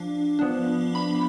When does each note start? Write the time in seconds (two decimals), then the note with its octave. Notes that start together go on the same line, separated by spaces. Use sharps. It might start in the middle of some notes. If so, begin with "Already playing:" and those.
Already playing: F3 D4
0.39 F3 B3 D4
0.95 B5